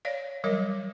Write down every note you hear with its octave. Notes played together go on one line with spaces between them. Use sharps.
C#5 D5 F5
E3 F#3 G3 A#4 C#5 D#5